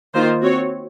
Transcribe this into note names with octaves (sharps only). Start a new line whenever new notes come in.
D#3 A#3 F4 C5
C4 F#4 C#5